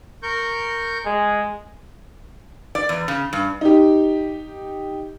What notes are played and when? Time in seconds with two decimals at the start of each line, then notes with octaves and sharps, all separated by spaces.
0.23 A#4 C#6 G6
1.06 G#3
2.75 D5
2.89 E2
3.08 C#3
3.33 G2
3.61 D#4 G4